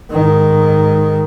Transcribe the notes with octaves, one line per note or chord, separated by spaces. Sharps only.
G#2 D#3